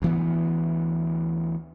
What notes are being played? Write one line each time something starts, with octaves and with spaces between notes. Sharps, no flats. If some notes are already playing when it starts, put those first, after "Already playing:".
D2 E3 B3